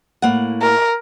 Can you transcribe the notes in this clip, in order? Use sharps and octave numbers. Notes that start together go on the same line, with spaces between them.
A2 A#3 F#5
A#4